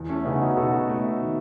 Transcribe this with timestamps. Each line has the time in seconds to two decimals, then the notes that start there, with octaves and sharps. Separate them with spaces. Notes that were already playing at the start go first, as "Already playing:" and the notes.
Already playing: E2
0.09 A3 C#4
0.24 C#3 B3 D#4
0.41 D#4 F#4
0.57 B2 F#4 A4
0.89 A3
1.22 D#3